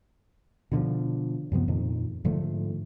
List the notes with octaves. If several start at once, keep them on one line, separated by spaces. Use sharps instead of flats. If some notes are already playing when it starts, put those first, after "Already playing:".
B2 D3 E3 F3
F#2 C3 F3 B3
F2 A#2 D#3
G#2 D3 F3 A3